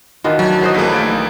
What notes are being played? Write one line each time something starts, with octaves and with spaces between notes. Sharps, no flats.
D#3 E3 D4 F4 F#4
F#3 G#5 A5
F#4 C5 D#5
B1 A3 A#3 G#4 A4 B4 D#5
G5 G#5